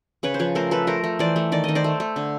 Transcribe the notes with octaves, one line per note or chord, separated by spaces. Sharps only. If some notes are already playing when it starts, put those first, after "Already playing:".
C#3 B4 C#5
C5
F3 B4 C#5
A3 A#4 C5
A3 A4 B4
A3 A#4 C5
A3
E3 C5 D5
A3
D#3 D5
D#3 D#5
C5 D5
A3
A3
D3